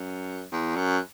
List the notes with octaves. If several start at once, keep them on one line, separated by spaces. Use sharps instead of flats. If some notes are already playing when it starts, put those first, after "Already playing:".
Already playing: F#2
E2
F#2